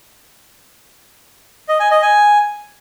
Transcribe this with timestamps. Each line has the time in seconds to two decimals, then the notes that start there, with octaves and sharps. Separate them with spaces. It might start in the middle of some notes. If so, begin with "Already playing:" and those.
1.69 D#5
1.80 G#5
1.91 D#5
2.02 G#5